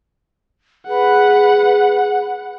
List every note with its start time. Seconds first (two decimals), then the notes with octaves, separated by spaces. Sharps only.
0.88 G#4 B4 F#5